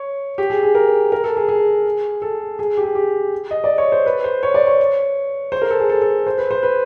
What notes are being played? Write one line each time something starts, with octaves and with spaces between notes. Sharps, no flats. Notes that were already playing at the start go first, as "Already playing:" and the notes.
Already playing: C#5
G4
G#4
G#4
A#4
A#4
A4
G#4
G#4
A4
G#4
G4
G#4
G4
D#5
D5
C#5
C5
B4
C5
C#5
D5
C#5
C5
A#4
A4
G#4
A4
A4
C5
B4
C5
B4